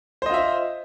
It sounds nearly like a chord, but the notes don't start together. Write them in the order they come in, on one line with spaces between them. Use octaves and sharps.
C5 D#5 F4 E5